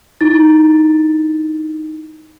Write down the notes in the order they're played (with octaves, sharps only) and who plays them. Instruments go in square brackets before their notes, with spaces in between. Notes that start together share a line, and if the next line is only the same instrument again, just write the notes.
[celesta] D#4 E4 A6